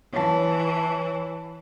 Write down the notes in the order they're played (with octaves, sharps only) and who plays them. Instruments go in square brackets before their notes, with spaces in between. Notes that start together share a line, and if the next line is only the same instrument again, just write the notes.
[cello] E3 [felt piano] C#5 A5